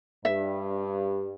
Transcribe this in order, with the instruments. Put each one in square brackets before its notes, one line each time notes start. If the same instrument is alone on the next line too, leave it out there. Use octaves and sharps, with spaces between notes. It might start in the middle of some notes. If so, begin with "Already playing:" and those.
[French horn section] G2 [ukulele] E5